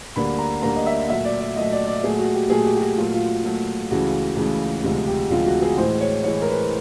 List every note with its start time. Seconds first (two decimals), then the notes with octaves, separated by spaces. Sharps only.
0.16 D2 D3 G3 A#3 B5
0.39 A#5
0.62 D2 D3 G3 A#3 A#5
0.76 D#5
0.86 E5
1.09 A#2 F#3 A3 E5
1.25 D5
1.40 D5
1.56 A#2 F#3 A3 D#5
1.72 D5
1.87 D5
2.03 A#2 F#3 A3 G#4
2.19 F#4
2.35 G4
2.50 A#2 F#3 A3 G#4
2.66 G4
2.76 G4
2.80 F#4
2.97 A#2 F#3 A3 F4
3.14 F4
3.43 A#2 F#3 A3
3.90 C#2 C#3 E3 A3 F#4
4.36 C#2 C#3 E3 A3
4.84 D2 C3 F3 G#3
5.07 G4
5.31 D2 C3 F3 G#3 F4
5.46 F#4
5.62 G#4
5.77 A2 E3 G#3 C5
6.01 C#5
6.24 A2 E3 G#3 C#5
6.42 A#4
6.48 B4